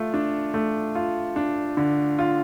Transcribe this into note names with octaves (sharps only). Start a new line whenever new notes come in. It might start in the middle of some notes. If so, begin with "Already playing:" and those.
Already playing: A3 F4
D4
A3
F4
D4
D3
F4